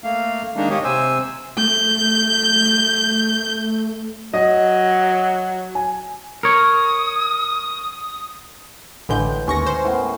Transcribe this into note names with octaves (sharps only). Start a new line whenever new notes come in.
A3 A#3 F5
D#3 G#3 A#3 D4 D#4
A#3 G4 C#5 D#5
C3 C5 G#5 E6
A3 G6
F#3 D#5
G#5
A#4 C#5 D#6
A1 A2 D3 G#3 B4 G6
D#2 C#4 C#6 A#6
C5
A2 B3 A#4